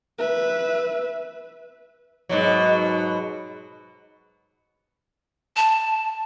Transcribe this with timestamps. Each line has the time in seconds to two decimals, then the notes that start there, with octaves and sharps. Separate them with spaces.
0.18 B4 E5
2.29 G#2 B2 F#3
5.56 A5